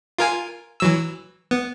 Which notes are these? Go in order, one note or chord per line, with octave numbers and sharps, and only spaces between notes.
F4 A#4 G#5
E3 F#3 E6
B3